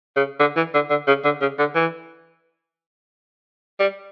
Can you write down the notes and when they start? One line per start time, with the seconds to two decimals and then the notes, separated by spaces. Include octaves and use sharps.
0.16 C#3
0.40 D3
0.56 E3
0.74 D3
0.90 D3
1.07 C#3
1.25 D3
1.41 C#3
1.59 D3
1.75 E3
3.80 G3